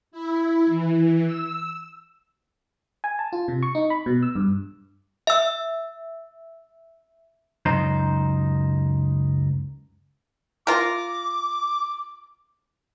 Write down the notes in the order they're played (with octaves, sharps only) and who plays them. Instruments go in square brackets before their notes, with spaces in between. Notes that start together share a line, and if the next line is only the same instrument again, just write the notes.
[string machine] E4
E3
E6
[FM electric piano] G#5
A5
F4
C3
C#6
D#4
B5
B2
E6
G2
[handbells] E5 E6
[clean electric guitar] C#2 F#2 D#4 C5
[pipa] F4 A#4 [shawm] D6